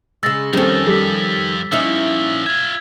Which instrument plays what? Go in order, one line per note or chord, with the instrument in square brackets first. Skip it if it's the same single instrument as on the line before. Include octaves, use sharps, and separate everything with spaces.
[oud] C#3 G#3 [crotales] E6 A6 A#6
[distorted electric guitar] F2 F3 [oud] D#3 C#4 [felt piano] G3 C4 A4
[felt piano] G3 G4 A4 [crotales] A#6 B6
[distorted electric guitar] F3 A#3 [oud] C#4 D#4 E4 [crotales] E6
[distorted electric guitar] F4 E5 [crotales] G#6